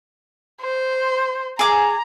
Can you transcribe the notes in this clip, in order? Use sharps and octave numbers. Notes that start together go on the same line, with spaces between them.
C5
G#4 A#5 D6